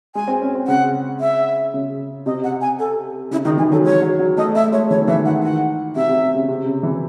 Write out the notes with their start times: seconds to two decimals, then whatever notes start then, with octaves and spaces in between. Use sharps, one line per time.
0.15 G#3 G#5
0.28 C4
0.41 C#4
0.55 C4
0.67 C#3 F#5
1.20 E5
1.74 C#3
2.26 C3 D#5
2.44 F#5
2.61 G#5
2.79 A4
3.31 C#3 E4
3.45 D#3 D#4
3.58 E3 G#4
3.72 F#3 A4
3.84 G#3 C#5
4.02 F#3
4.19 F#3
4.37 A3 D#5
4.55 A3 E5
4.72 G#3 C#5
4.90 E3 C#5
5.02 D#3
5.07 E3 E5
5.25 D#3 F#5
5.43 F#5
5.96 C3 E5
6.08 C3
6.23 C3
6.35 C#3
6.48 C3
6.66 C#3
6.83 E3